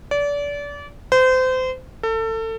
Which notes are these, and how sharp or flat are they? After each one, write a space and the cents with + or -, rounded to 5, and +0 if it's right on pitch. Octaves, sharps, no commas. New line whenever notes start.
D5 -30
C5 -30
A4 +30